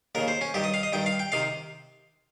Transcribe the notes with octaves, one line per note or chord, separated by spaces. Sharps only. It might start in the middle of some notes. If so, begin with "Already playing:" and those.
D#2 C#3 A#4
C5
C#4
G2 D#3 G4
D#5
F5
D#5
G2 D#3 G5
F5
G5
C3 D#3 F5